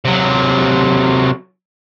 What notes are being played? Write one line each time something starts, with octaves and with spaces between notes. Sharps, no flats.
C3 F#3